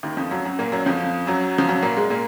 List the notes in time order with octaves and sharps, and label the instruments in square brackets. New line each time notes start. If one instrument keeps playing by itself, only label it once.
[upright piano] D#2 D#3
F2 F3
F#2 F#3
F#2 F#3
A#2 A#3
F#2 F#3
F2 F3
F#2 F#3
F3
F#2 F#3
A#2 A#3
G#2 G#3
A#2 A#3